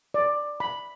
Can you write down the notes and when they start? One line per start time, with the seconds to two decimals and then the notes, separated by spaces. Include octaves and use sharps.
0.14 D5
0.60 B5